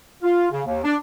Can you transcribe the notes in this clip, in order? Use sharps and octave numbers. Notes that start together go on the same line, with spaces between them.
F4
C#3
D#2
D4